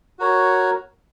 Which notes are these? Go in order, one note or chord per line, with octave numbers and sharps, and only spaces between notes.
F#4 A#4 C#5